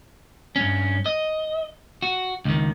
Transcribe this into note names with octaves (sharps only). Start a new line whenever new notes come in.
G2 C#4
D#5
F#4
C#2 D#3